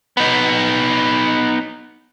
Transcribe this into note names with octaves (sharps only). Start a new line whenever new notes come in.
B3 D#4